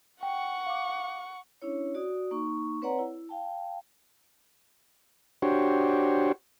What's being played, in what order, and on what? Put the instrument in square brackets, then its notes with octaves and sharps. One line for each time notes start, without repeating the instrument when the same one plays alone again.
[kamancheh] F#5 C#6 [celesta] G5
[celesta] F5 D6
[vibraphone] C#4 D4 E4 C#5
F#4 D5 D#6
A#3 D#4 C#6
C4 B4 C#5 D5 F#5 A#5
E4
F5 G5 A5
[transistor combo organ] D4 F#4 G4 C5 C#5